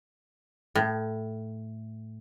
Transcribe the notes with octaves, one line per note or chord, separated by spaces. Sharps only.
A2